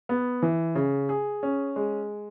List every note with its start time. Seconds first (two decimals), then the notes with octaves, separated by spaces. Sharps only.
0.09 B3
0.42 E3
0.75 C#3
1.09 G#4
1.43 C#4
1.76 G#3